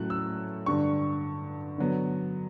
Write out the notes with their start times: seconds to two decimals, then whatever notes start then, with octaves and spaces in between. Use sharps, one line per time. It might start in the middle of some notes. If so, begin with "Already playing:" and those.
Already playing: A2 F#3 A3 C#4 F#6
0.10 E6
0.66 G2 D3 G3 C#6
1.78 D3 F#3 B3